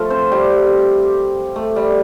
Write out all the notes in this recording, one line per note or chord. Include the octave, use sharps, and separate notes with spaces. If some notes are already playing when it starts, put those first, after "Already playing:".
Already playing: F3 A3 F4 A4
C4 C5
G3 G4
A3
G3